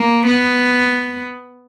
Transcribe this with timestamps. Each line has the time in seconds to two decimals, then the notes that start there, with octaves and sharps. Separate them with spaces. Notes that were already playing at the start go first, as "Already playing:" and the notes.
Already playing: A#3
0.26 B3